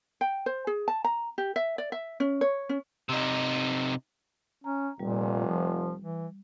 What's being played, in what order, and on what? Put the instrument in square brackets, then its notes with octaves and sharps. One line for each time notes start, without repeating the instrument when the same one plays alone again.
[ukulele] G5
C5
G#4
A5
A#5
G4
E5
D5
E5
C#4
C#5
C#4
[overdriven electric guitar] C3 D#4
[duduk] C#4 [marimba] A#5
[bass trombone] F1 [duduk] A#2 [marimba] G3
[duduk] F3
E3